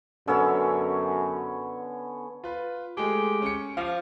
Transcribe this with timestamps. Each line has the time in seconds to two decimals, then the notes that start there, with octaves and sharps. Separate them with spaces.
0.28 F#2 D3 B3 C#4 C#5 E6
2.44 F4 B4
2.97 G#3 A3 G4 G#4
3.42 C#4 C#7
3.77 F3 F5 D6